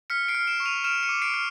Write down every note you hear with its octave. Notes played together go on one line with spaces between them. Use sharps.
F6 B6 C#7
C7 D7
F6
D7 E7
C#6
D#7 F7
F6 D7 E7
C#7 D#7
D6
C7 D7
F6